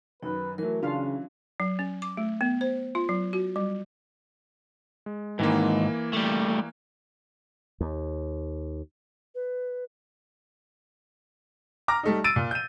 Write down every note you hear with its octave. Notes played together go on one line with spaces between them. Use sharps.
F#2 D#3 D#4 B4
E3 F#3 A3 A#4
C#3 C#4 D4 F4 F5
F#3
C#4
D6
A3
B3
C5
F4
F#3
F#4
G3
G#3
G#2 D#3 E3 A#3
G3 A3
D#2
B4
A#5 D6 F6 A#6
G3 A3 D#4
E6 A6 D7 D#7
A#2
G6 D#7